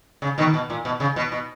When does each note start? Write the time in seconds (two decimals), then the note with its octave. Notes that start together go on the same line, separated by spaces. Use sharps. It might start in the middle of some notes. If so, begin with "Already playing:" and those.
0.22 C#3
0.38 B2 D#3
0.54 B2
0.70 A#2
0.85 B2
1.00 C#3
1.16 B2
1.32 B2